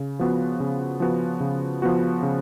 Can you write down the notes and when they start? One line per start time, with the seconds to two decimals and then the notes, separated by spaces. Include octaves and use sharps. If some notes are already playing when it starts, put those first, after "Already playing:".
Already playing: C#3
0.19 F3 B3 F#4
0.60 C#3
1.00 F3 B3 F#4
1.40 C#3
1.82 F3 B3 F#4
2.23 C#3